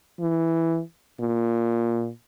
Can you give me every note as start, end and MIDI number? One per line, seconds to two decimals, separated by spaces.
0.20 0.81 52
1.20 2.09 46